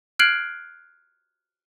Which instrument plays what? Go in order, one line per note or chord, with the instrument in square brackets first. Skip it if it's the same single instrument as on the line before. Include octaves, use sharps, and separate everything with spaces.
[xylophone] F6 F#6 G#6 C7 D7 F#7